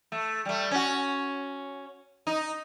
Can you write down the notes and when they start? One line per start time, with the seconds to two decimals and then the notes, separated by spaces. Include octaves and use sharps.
0.12 A3
0.45 G3 A3
0.71 C#4 F#4
2.27 D#4